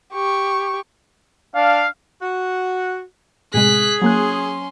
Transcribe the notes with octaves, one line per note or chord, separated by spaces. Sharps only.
G4 C#6
D4 F5
F#4
A2 C3 G#3 G#4 F#6 B6
F#3 A#3 C#4 C6 F#6